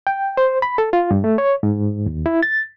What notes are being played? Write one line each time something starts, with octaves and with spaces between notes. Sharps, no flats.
G5
C5
B5
A4
F4
G2
A3
C#5
G#2
D#2
E4
A6